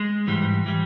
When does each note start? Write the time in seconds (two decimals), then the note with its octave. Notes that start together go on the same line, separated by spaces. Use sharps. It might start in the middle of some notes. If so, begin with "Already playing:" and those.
Already playing: G#3
0.27 G#2 E3 G3
0.66 E3 G3